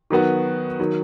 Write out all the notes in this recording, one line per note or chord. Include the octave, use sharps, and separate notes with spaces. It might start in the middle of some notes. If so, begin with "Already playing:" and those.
D#3 F#3 B3 F#4
D#3 F#3